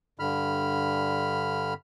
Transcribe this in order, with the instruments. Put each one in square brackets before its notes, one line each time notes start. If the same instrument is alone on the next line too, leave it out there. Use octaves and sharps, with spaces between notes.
[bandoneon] G2 D3 B5 F6